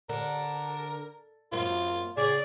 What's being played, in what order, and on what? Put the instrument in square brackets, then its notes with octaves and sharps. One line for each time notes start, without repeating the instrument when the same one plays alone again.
[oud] D3 [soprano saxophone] A#4
[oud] F#2 A#3 C4 [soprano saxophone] F4
[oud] C#3 [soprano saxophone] G#4 [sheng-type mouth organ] D5